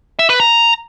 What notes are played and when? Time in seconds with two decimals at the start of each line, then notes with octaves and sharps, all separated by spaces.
0.19 E5
0.30 B4
0.40 A#5